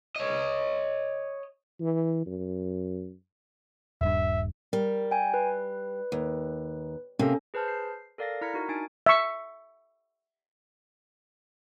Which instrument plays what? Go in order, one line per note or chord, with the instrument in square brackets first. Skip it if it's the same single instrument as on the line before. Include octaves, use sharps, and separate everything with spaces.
[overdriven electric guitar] C#5 D#5
[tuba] E3
F#2
[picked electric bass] D#1 G2 [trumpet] E5
[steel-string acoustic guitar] G3 [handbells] A#4
[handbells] G5 G#5
B4
[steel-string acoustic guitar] D#2
[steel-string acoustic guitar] C3 A#3 [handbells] C#4 A4
[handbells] G#4 B4 C5 A5 F6 G6
C7
A4 A#4 D5 F5 A6 A#6
E4 A#5 F6 G#6 B6 C#7
D#4 F#4 A#4
D4 D#4 G#5 A6 D7
[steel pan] E5 C#6